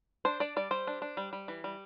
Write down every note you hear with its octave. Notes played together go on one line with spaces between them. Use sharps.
D4 C5
D4 D5
G3 D5
G3 C5
D4
D4
G3
G3
E3
G3